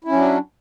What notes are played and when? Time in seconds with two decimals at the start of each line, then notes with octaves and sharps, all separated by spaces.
0.04 E4
0.08 C#4
0.12 F#3
0.16 D4